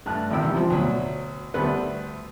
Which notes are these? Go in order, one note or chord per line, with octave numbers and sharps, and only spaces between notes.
G2 A3 F#6
A1 C3 D#3 G5 E6
E2 G3
C3 F3 C4
D2 B2 F#3
D2 G3 A3 B3 B4 C5